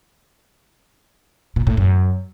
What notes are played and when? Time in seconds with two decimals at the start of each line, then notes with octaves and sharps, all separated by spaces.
1.56 A#2
1.67 A2
1.77 F#2